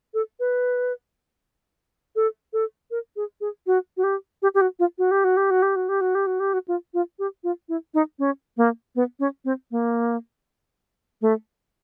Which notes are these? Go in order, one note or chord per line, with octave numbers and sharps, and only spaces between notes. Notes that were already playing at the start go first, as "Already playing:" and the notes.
A4
B4
A4
A4
A#4
G#4
G#4
F#4
F#4
G4
G4
G4
F#4
F4
F#4
G4
F#4
G4
F#4
G4
F#4
G4
F#4
G4
F#4
G4
F#4
F4
F4
G4
F4
E4
D#4
C#4
A#3
B3
C#4
C4
A#3
A3